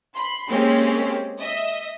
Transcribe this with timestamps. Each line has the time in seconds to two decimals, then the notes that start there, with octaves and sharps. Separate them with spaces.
0.15 B5 C6
0.48 G#3 A#3 C4 C#4 G4
1.40 D#5 E5